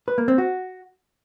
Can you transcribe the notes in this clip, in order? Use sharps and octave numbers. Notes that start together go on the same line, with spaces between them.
B4
A#3
C4
F#4